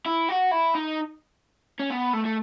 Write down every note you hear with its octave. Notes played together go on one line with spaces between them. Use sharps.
E4
F#4
E4
D#4
C#4
B3
A3
A3